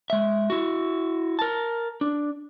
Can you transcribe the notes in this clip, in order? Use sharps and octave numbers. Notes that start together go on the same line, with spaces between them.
G#3 E5
E4 F#4
A#4 A5
D4